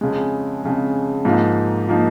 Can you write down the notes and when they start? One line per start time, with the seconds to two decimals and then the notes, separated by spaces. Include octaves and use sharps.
0.01 F2 C#3 G#3
0.63 F2 C#3 G#3
1.25 G#2 F3 A#3 D#4
1.88 F3 A#3 D#4